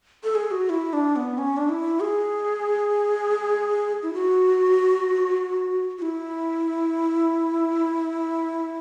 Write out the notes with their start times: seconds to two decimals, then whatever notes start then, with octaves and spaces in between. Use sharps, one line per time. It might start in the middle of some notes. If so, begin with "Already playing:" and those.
0.24 A4
0.35 G#4
0.47 G#4
0.51 F#4
0.70 E4
0.93 D4
1.16 B3
1.38 C#4
1.57 D4
1.69 E4
2.00 G#4
4.03 E4
4.14 F#4
5.98 F#4
6.02 E4